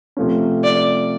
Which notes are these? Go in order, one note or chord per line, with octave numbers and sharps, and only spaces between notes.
C3 F3 A3 C#4
D5